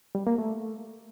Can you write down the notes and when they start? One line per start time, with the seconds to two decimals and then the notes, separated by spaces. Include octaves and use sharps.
0.15 G3
0.27 A#3
0.38 A3